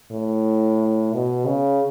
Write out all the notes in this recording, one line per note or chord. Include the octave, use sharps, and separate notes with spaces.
A2
B2
C#3